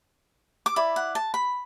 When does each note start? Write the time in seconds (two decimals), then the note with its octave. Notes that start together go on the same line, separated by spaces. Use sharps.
0.66 D6
0.76 E4 D5 B5
0.96 F#5
1.15 A5
1.34 B5